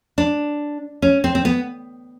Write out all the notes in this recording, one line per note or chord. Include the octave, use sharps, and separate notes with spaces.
D4
C#4
C4
C4
B3